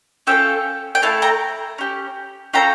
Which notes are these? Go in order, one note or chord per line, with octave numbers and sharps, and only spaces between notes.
C#4 F4 A4 E5 G5
G5
A3 E4 A4 F5 A5
G5 A#5
C#4 G4
C#4 F4 A4 G5 A#5